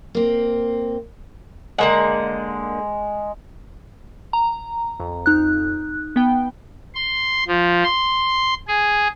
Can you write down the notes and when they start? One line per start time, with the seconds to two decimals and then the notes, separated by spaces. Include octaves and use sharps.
0.15 A#3 C4
1.78 D3 G#3 A#3 F#5
4.33 A#5
5.00 F2
5.26 D#4 F#6
6.16 B3 G5
6.95 C6
7.48 F3
7.84 C6
8.68 G#4